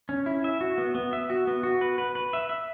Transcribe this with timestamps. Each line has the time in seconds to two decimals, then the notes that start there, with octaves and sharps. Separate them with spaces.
0.09 C#4
0.26 E4
0.44 E5
0.61 F#4
0.78 B3
0.95 B3
1.13 E5
1.30 F#4
1.47 B3
1.63 F#4
1.81 B4
1.98 B4
2.15 B4
2.33 E5
2.49 E5